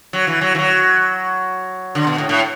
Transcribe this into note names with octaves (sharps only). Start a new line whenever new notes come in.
F#3
E3
F#3
E3
F#3
D3
B2
A2
A2